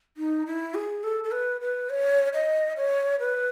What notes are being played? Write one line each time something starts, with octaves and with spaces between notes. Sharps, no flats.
D#4
E4
G#4
A4
A4
B4
B4
C#5
D#5
C#5
B4